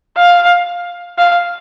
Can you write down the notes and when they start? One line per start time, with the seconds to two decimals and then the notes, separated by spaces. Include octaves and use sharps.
0.17 F5
1.19 F5